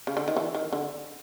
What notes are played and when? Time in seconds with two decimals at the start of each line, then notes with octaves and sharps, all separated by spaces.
0.07 C#3
0.17 D3
0.28 D#3
0.37 E3
0.55 D#3
0.73 D3